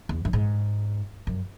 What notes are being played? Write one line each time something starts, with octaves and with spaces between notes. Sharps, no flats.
E2
F#2
G#2
F#2